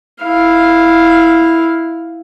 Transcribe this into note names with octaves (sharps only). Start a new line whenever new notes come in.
E4 F5